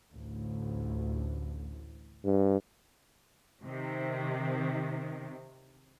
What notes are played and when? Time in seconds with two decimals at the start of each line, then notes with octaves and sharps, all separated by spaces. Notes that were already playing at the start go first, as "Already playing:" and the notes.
0.12 A1 D2
2.25 G2
3.64 C3 D#3